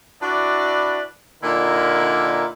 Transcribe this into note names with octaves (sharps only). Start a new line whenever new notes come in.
D4 E4 F#4 B4 D5
A#2 D3 D#4 E4 A#4